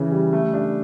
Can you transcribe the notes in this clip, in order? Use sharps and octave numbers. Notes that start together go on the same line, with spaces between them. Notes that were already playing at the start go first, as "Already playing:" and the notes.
Already playing: C#3 E3
G3
A3
D4